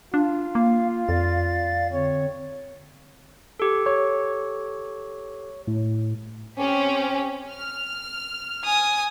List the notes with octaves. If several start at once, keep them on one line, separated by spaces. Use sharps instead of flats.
D4 F4
A#3 F5
F2 D5 F5 A6
D3 C4 C#5
G4 A4
C#5
A2
C4 C#4 G4
F6
G#5 D#6